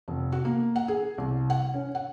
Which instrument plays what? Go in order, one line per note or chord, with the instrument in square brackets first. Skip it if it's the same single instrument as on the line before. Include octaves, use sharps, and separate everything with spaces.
[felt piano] F1
F#4
A#3
F#5
G#4
C2
F#5
C#4
F#5